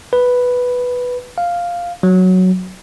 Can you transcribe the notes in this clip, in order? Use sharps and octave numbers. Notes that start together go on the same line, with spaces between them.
B4
F5
F#3